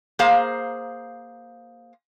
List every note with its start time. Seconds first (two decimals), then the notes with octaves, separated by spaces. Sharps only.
0.19 A#3 G#4 C5 F5 A#5